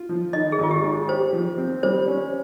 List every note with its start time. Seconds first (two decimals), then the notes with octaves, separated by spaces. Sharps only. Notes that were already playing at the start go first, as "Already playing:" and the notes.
Already playing: F4
0.09 F3
0.33 D#3 D#5
0.52 G#4
0.58 G#1 F4
0.71 G4
0.84 G#2
1.08 G4 C5
1.33 F3
1.58 C4
1.83 G3 C5
2.07 C#4